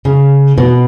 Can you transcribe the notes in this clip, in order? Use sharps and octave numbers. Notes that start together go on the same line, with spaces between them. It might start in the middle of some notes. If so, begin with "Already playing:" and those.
C#3
B2